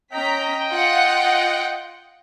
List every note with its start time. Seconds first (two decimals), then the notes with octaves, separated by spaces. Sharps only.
0.13 C#4 D#5 G5 A#5 B6
0.72 F4 F#5